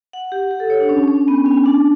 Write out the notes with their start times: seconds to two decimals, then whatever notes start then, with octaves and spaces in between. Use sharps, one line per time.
0.13 F#5
0.32 G4
0.51 G4
0.60 A4
0.70 C#5
0.80 D4
0.89 C#4
1.08 C#4
1.28 B3
1.46 C#4
1.66 D4